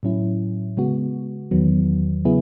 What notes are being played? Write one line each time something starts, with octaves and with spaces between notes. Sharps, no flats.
A2 F#3 C#4 E4
C#3 G#3 B3 F#4
E2 D#3 F#3 B3
C#3 F#3 B3 E4 G#4